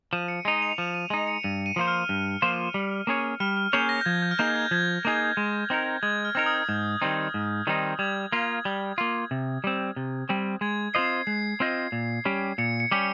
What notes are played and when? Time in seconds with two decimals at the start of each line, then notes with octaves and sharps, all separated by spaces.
0.13 F3 D#7
0.28 C#7
0.45 G#3 D#4
0.62 F7
0.78 F3 D#7
0.94 D#7
1.10 G#3 D#4 D#7
1.27 C#7
1.44 G2 D#7
1.66 D#7
1.76 F3 A#3 F4 C5
1.88 F6
2.09 G2
2.42 F3 A#3 F4 C5
2.74 G3
3.07 A#3 C#4 G#4 C#5
3.40 G3 F6
3.57 F6
3.73 A#3 C#4 G#4 C#5 G6
3.89 A#6
4.01 G6
4.05 F3 G#6
4.22 G6
4.31 F6
4.39 A#3 D#4 G#4 G6
4.56 G#6
4.71 F3 G#6
5.05 A#3 D#4 G#4
5.37 G#3
5.70 C4 D#4 A#4
6.03 G#3 G#6
6.25 F6
6.35 C4 D#4 A#4
6.46 D#6
6.68 G#2 G6
7.01 D#3 G3 C4 D#4
7.34 G#2
7.67 D#3 G3 C4 D#4
7.99 G3 G#6
8.32 A#3 F4
8.65 G3
8.98 A#3 F4
9.31 C3
9.64 G3 C4
9.96 C3
10.29 G3 C4
10.61 G#3 G#6
10.94 C4 F4 C5 D#5 C7
11.27 G#3 C7
11.60 C4 F4 C5 D#5
11.92 A#2
12.25 G3 C#4 G4
12.58 A#2 C#7
12.80 C#7
12.91 G3 C#4 G4